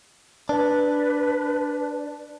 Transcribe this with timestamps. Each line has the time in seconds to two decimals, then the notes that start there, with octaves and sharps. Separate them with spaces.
0.49 D4 B4